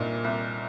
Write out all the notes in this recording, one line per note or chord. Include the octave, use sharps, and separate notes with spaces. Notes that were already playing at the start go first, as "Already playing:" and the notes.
Already playing: C2 A#2 D4 D#4
C2